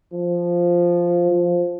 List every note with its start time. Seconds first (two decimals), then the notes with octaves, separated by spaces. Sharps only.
0.13 F3
1.31 F3